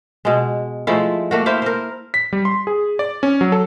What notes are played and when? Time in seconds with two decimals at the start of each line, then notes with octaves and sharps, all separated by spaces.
0.25 B2 G#3
0.87 F3 G#3 A3 E4
1.31 A3 A#3 F#4
1.46 E4 C5 F5
1.62 A#4 C5
2.14 B6
2.33 G3
2.45 C6
2.67 G#4
2.99 D5
3.23 C#4
3.41 F#3
3.52 A4